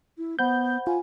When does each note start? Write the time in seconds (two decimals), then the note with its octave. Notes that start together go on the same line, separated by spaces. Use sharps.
0.18 E4
0.39 B3 C5 F#5 B5 G6
0.87 F4 G#5